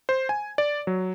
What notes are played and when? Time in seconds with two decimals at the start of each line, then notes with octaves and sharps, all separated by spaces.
0.09 C5
0.29 G#5
0.58 D5
0.87 F#3